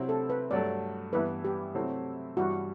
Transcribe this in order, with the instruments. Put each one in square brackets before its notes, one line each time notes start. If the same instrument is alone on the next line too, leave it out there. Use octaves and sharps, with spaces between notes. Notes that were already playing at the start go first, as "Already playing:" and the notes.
Already playing: [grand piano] C3 F#3 C4 E4
[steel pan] A4
B4
[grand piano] G2 F#3 A3 [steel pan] D5
[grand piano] G2 E3 B3 E4 [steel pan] B4
[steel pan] G4
[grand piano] C3 F#3 A3 C4 E4
[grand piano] G2 E3 G3 [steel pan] F#4